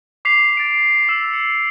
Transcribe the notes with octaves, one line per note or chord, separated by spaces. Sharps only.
D6 B6 C7 F7
A6 D7
E6 E7
C#7